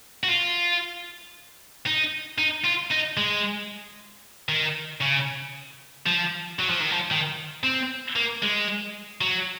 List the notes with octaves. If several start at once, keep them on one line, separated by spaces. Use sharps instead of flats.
F#4
F4
D#4
D#4
F4
D#4
G#3
D#3
C#3
F3
F#3
F3
D#3
F3
D#3
C4
A#3
G#3
F#3